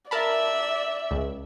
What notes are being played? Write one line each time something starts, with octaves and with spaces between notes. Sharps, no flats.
A#4 D5 E5 A5 B5
C#2